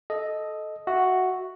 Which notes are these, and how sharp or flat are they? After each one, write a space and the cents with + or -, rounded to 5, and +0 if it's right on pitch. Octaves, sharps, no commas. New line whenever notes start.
A4 -15 D#5 +0
F#4 +0 E5 +0